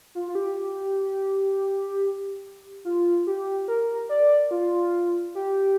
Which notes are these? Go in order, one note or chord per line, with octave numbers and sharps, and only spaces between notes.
F4
F4
G4
F4
G4
A#4
D5
F4
G4